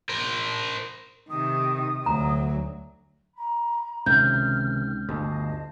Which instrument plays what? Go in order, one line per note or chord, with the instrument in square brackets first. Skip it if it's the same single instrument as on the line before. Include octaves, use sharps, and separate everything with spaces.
[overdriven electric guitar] A#4 C5
[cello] C3 D#3 [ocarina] D#6
[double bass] D2 [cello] F#3 [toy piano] A#5
[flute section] A#5 B5
[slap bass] C#2 [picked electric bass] C3 D#3 [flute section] F6 [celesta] G6
[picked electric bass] G1 D2 [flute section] D#5 F5 A5